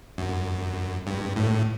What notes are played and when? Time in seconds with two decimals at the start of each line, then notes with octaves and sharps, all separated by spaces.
0.18 F#2
1.07 G2
1.36 A2